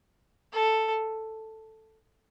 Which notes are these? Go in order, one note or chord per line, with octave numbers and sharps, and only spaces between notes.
A4